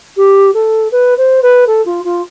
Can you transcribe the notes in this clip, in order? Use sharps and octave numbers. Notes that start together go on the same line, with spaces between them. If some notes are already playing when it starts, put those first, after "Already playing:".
G4
A4
B4
C5
B4
A4
F4
F4